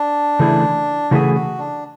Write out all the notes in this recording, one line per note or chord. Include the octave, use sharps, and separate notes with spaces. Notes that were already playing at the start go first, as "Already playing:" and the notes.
Already playing: D4
C#3 E3 A3 E4 G#4
C#3 E3 A3 E4 F#4 G#4
F#4
D4